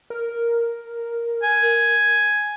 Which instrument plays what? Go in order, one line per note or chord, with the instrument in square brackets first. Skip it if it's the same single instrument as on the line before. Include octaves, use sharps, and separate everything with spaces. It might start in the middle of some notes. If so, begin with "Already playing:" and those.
[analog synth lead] A#4
[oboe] G#5